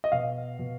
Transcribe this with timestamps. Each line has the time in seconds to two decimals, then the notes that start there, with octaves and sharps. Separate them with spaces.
0.04 D#5
0.12 B2 F5
0.59 B2